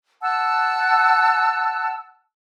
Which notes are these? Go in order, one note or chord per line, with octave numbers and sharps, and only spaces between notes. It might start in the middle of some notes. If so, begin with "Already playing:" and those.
F#5 A5 E6 F#6